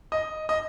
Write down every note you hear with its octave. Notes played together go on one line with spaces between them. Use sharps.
D#5
D#5